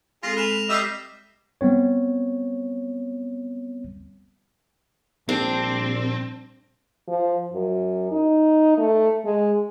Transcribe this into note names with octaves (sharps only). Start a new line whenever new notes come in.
G#3 C4 F4 G#4 A4 A#6
B4 F6 E7 F7
G3 D#5 E5 E6 B6 C7
G3 B3 C4 C#5
A#1 A#2 G3 C4 D4
F3
F#2
D#4
A3
G#3